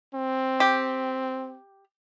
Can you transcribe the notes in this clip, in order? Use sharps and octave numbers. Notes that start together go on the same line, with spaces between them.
C4
G4